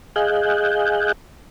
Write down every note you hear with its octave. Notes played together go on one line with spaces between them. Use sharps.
G#4 D#5 F5 G#5 F#6 G6